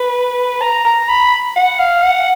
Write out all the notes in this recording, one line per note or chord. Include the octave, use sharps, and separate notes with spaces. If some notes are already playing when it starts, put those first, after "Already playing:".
Already playing: B4
A#5
A#5
B5
F#5
F5
F#5